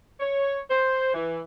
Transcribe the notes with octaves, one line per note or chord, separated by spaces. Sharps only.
C#5
C5
E3